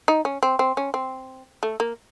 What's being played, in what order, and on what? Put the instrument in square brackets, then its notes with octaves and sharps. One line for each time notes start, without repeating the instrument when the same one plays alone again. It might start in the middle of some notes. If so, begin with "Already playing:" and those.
[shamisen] D#4
C#4
C4
C4
C#4
C4
A3
A#3